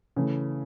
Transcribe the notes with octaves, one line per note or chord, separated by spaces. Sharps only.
C#3 E3 A3